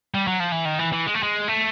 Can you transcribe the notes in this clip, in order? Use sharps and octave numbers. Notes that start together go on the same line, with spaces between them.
G3
F#3
F3
E3
D#3
E3
E3
G#3
A3
G#3
A3